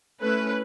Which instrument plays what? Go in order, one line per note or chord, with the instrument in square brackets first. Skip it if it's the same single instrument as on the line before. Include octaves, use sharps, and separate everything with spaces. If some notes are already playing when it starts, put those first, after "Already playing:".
[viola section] A3 C#4 E4 B4